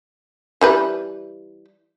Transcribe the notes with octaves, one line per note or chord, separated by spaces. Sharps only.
E3 G3 B4